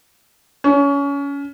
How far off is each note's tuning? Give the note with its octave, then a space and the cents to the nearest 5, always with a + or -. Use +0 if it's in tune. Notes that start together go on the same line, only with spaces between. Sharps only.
C#4 +25